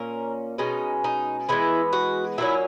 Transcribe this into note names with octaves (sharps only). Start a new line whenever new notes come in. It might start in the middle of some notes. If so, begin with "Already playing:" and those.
Already playing: A#2 A#3 C#4 A#4
B2 G#3 C#4 D#4
D#4
E3 G#3 B3 E4
F#4
A#2 F#3 C#4 E4